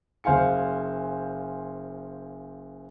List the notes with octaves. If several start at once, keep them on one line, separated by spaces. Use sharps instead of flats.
F#1 C5 F5 G#5 C#7